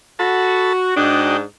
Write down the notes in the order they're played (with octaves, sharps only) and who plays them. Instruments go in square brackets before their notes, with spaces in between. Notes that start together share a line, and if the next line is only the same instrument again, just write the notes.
[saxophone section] F#4 [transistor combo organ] A4 A5 B5
[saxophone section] G#2 D4 [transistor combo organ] F#4 D#5 G5